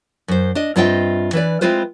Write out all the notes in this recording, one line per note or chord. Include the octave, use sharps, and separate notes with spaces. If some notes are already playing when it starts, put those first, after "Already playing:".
F#2 C5
D4 D#5
G2 C4 F4 D#5 E5 G5
E3 B4 D5
G#3 C4 E4 F4 B4 C5